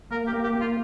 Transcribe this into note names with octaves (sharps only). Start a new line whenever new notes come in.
A#3 A#4
G4
A#3
G4
A#3
F4